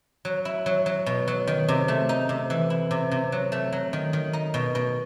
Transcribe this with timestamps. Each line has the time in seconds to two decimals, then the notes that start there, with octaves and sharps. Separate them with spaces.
0.25 F#3
0.45 E4
0.66 F#3
0.86 F#3
1.06 B2
1.28 F#3
1.47 D#3
1.68 C3
1.88 A3
2.09 D#4
2.29 C3
2.50 E3
2.70 E4
2.91 C3
3.11 C3
3.32 F#3
3.52 A3
3.73 F#3
3.93 D#3
4.13 D#3
4.33 D#4
4.54 B2
4.75 B2